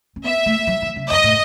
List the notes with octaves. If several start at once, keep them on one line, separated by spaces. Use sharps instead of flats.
C#4
B3 E5
A3
F#3
E3
C#3
F#2 D#5
A2